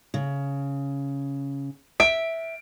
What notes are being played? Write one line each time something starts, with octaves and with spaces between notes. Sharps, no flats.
C#3
E5 D7